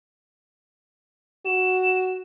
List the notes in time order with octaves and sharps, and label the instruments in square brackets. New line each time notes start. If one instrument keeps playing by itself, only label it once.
[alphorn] F#4 [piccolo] E7